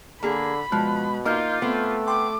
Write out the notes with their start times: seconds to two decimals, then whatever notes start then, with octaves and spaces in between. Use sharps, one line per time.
0.23 D3 A#3 G#4 B5
0.72 B2 F3 G#3 F#6
1.25 A#3 D#4 F4 D6 F6 G6
1.62 A3 B3 C4
2.08 G5 C6 D6